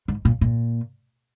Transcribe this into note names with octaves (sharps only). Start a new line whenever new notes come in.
G#2
A#2
A#2